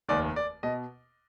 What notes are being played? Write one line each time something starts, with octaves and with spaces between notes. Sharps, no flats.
F1 D#2 D#3 D5
D5
B2 D#5